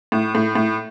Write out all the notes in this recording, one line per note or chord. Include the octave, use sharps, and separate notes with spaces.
A2
A2
A2